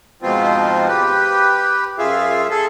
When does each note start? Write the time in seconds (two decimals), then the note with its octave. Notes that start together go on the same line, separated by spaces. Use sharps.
0.22 G#2 B2 F3 C4 F4
0.88 G4 B4
1.99 F#2 F4 G#4 E5 F5
2.50 G#4 A4